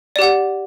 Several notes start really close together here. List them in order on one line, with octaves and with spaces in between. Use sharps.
D5 G4 F#5